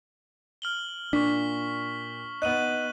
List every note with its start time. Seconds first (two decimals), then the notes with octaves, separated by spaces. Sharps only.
0.62 F6 F#7 G7
1.13 A#2 D4 C#6 B6
2.42 B3 D#4 F#6 D#7 F#7